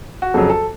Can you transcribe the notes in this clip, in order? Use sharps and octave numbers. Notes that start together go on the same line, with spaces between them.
F#4
F2 C#3 F#3 A4
A4